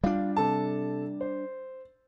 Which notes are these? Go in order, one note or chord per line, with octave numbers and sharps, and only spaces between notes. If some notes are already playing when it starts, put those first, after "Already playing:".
G3 D4 F4
C3 A4 A5
C5